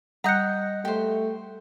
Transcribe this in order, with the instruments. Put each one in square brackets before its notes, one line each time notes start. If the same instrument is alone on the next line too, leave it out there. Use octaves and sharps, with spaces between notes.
[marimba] G3 F#6 [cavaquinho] D#5 A#5 [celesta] F#5 G6 C#7
[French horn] A3 [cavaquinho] G4 C5